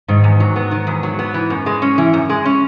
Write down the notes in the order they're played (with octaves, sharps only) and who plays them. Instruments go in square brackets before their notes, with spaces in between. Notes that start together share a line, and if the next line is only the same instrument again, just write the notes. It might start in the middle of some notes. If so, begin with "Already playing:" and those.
[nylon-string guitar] G#2 [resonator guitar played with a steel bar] D#3
[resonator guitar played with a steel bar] E2
F#3
B3
D#3
E2
F#3
B3
E3
F#2
G#3
C#4
E3
F#2
G#3
C#4